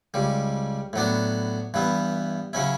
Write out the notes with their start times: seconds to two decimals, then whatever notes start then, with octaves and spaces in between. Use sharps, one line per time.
0.14 C#2 C#3 G3
0.93 A2 F#3 B3 D4
1.74 G2 E3 B3 E4
2.53 C#3 F#3 C#4 E4